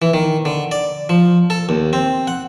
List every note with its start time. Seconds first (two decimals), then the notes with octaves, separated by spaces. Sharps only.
0.02 E3
0.14 D#3
0.45 D3
0.71 D5
1.09 F3
1.50 A4
1.69 D#2
1.93 C4
2.27 F#5